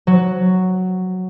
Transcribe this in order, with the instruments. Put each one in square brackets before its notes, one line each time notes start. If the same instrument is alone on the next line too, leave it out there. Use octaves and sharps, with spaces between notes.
[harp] F#3